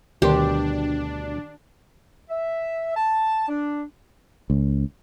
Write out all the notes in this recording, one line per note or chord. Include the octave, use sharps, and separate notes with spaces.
D2 B2 D#3 G3 D4 G4 A#4 C6
E5
A5
D4
C#2